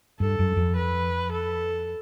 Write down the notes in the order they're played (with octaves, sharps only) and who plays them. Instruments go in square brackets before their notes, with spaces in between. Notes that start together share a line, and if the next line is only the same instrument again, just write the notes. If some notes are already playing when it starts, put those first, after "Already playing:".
[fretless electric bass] G2 [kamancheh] A4
[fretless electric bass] F#2
F2
[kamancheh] B4
A4